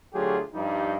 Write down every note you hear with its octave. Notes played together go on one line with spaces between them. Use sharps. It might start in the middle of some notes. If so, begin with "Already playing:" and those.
D2 F#3 F4 G4 G#4
G2 F3 G3 D#4